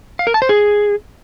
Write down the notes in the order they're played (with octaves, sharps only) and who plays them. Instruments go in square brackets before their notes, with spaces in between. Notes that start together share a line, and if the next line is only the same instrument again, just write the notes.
[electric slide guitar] F5
A#4
A5
C5
G#4